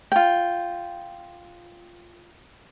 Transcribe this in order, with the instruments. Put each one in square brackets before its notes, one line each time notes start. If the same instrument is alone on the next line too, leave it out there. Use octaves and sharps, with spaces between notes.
[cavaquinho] F4 G5